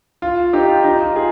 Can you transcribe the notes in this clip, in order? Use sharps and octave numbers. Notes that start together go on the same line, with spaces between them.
F4
D#4 G4
F4
D#4
F4
F4 G#4